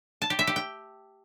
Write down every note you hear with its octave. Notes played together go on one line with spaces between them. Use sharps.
A5
G4
E5
G4
G5